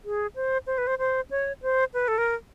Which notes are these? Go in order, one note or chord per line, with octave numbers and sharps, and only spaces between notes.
G#4
C5
C5
B4
C5
C5
C#5
C5
B4
A4
A#4